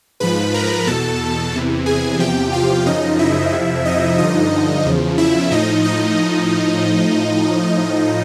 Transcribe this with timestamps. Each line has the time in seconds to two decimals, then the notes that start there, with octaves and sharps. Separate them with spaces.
0.20 G#2 F3 B4 B5
0.54 A#4 A#5
0.87 E2 B2 A4 A5
1.53 E2 C3 E3
1.86 G#4 G#5
2.19 E2 C3 F3 G4 G5
2.53 F4 F5
2.86 F#2 C#3 F3 D#4 D#5
3.19 E4 E5
3.52 F2 C3 F3
3.86 D#4 D#5
4.18 G2 D3 F3 D#4 D#5
4.86 E2 C#3 F3
5.18 E4 E5
5.51 A2 F3 D#4 D#5
5.84 D#4 D#5